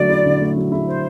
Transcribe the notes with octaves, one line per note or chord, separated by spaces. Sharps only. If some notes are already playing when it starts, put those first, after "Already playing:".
Already playing: D3 F#3 A3 D5
E4
D3
A3
F#3
E4
C5